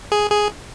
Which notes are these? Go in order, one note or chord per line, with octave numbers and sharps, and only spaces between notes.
G#4
G#4